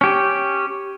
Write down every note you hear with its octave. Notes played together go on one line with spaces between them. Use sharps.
C#4 G4